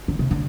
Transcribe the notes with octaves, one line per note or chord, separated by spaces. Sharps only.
D3
C3
D3